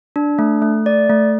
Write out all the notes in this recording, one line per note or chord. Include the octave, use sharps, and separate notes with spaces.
D4
A3
A3
D5
A3